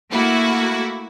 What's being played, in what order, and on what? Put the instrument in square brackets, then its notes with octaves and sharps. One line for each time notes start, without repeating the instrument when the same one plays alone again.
[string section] A3 A#3 E4 F#4